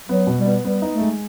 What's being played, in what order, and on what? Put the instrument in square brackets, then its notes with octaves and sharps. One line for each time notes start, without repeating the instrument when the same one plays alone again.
[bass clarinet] F#3 [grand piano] B3
[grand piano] B2
[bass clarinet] G3
[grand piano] B3
[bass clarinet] G3 [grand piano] B3
[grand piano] D#4
[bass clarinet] A3
[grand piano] G#3